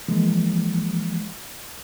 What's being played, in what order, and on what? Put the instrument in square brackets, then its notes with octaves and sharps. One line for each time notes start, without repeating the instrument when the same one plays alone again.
[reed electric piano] E3 F3 G#3 A#3